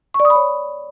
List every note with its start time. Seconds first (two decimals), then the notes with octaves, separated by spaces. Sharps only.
0.14 C#6
0.20 D5
0.25 D#6
0.30 B5
0.35 C#5